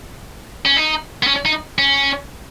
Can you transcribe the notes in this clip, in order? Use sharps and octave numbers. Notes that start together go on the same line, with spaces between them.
C#4
D#4
B3
C#4
D#4
C#4